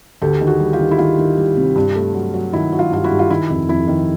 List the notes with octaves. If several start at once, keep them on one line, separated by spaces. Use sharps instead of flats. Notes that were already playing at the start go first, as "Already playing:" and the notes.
D2 G4 A4
D#3
F#4 G#4
G3
F4 G4
D#3
E4
D#3 F4
D#3
G3
C3
G2
A3
F#3
F#3
D#3 E4
F#3
F4
G2 F4
E4 F#4
G2
F4
D#3 E4
F1
F2 E4
D#3